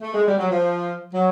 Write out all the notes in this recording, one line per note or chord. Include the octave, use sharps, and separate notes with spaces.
A3
G#3
G3
F#3
F3
F#3